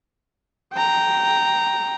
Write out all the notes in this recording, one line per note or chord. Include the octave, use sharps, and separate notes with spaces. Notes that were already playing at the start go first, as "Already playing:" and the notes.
G5 A#5